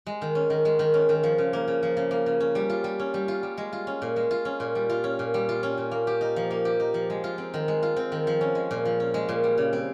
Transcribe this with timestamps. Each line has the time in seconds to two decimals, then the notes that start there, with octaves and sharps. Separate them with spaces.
0.07 G#3
0.22 D#3
0.35 C#4
0.50 D#3
0.65 G#3
0.79 D#3
0.94 C#4
1.09 D#3
1.23 F3
1.38 C#3
1.53 A#3
1.68 C#3
1.83 F3
1.97 C#3
2.11 A#3
2.26 C#3
2.40 C#4
2.55 G3
2.70 F4
2.84 G3
2.99 C#4
3.14 G3
3.28 F4
3.43 G3
3.58 G#3
3.73 F4
3.87 C#4
4.02 A#2
4.16 G#3
4.31 F4
4.45 C#4
4.60 A#2
4.75 G3
4.90 F4
5.04 C#4
5.19 A#2
5.34 G3
5.49 F4
5.63 C#4
5.77 A#2
5.92 A#3
6.07 G4
6.21 D#4
6.36 F3
6.51 A#3
6.65 G4
6.80 D#4
6.94 F3
7.10 G#3
7.24 F4
7.38 C4
7.54 D#3
7.68 G#3
7.83 F4
7.97 C4
8.12 D#3
8.27 F3
8.41 C#4
8.55 G#3
8.71 A#2
8.85 F3
9.00 C#4
9.14 G#3
9.29 A#2
9.44 G3
9.58 C#3
9.73 C4